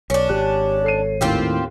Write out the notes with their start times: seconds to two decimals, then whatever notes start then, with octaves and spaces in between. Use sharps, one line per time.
0.10 B1 C#4 D4
0.29 G#1 G4 C#5 F#6
0.84 A4 C7 D#7
1.21 D#2 A2 C4 F4 G4